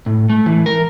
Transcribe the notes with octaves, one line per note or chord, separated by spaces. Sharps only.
A2
A3
E3
A#4